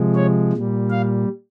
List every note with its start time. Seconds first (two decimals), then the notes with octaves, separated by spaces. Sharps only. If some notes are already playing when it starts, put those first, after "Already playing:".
Already playing: C3 F3 G#3
0.15 C#5
0.53 A#2 G3
0.91 F5